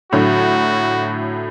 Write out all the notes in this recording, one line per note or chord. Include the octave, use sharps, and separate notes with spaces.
A2 D3 F#3 F#4